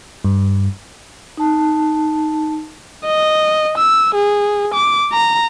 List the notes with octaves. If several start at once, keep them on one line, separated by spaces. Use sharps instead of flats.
G2
D#4 A5
D#5
E6
G#4
D6
A#5